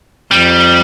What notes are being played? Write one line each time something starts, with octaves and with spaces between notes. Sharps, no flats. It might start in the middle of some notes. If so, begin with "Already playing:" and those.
F2 G3